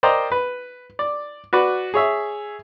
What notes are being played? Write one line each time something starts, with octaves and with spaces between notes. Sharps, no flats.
A#4 C5 D5 D#5 G5 A#5
B4
D5
F#4 B4 D5
G#4 C#5 E5